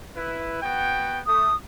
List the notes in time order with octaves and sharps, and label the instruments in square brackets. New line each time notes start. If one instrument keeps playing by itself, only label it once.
[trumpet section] E4 B4
B3 F#4 G5
[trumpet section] A3 [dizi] D#6